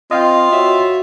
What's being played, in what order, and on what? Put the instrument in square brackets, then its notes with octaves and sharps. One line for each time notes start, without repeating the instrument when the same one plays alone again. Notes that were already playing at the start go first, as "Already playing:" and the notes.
[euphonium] C4 [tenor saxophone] F4 [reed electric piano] D#5 F5 G5
[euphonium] F#4 [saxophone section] C#5 E5